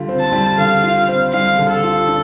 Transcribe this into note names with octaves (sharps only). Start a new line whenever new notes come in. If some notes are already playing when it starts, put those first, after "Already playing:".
Already playing: D3 G3 F4
C4
A5
G3
D3 F5
F4
C4
G3 F5
D3
A4
F4
D4